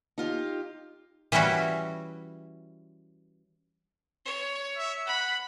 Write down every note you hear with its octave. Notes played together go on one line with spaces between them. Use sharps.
D#4 F4 G4
E3 G3 C#4 E4 F#4
C#5
E5
F#5 B5